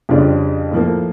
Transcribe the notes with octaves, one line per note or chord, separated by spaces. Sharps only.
F2 C#3 G3 D4 F4
A2 F3 A#3